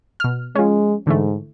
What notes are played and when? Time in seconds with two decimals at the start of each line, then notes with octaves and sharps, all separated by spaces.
0.20 B2 F6
0.56 F3 G#3 C#4
1.07 G#2 D3 E3 A3